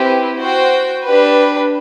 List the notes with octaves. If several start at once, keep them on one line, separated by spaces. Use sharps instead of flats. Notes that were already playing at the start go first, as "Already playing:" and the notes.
Already playing: C4 E4 G4 B4
F#4 C5 G5
D4 G4 B4